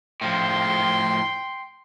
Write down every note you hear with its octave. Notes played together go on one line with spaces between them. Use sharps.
A2 F3 G5 C6